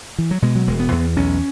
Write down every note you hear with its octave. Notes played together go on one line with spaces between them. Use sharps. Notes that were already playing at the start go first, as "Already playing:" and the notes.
E3
F#3
B2 G#3
F#3
E1 G#3
B3
E2
B1 C#4